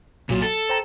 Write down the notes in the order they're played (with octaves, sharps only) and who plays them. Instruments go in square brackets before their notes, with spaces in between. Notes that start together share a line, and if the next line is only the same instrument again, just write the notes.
[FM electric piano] B1 F#3 [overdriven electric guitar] A#2
[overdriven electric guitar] A4 [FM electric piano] A5 A6
[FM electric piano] C5 G5 A#5